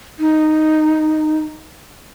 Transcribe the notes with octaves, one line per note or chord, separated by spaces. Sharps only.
D#4